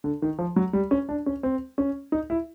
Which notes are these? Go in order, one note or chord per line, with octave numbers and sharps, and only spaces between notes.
D3
D#3
F3
F#3
G3
C#4
D4
C#4
C4
C#4
D#4
E4